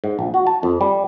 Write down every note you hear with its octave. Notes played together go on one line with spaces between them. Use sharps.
G#2
A#1
F#4
A5
F2
G3